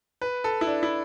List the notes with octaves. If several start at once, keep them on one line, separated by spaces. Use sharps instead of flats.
B4
A4
E4
D4
E4